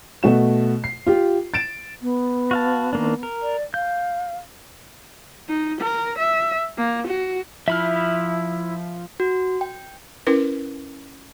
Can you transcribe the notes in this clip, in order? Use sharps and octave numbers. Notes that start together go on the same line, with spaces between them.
B2 A3 F#4 E7
C7
F4 G4
A6 D7 E7
B3
F#4 F5 A5
D#3 A#3 D4
A#4
D5
F5 G6
D#4
A#4
E5
A#3
F#4
F3 E4 E5 B5 F6
F#4
G5
C#4 E4 A#4 B4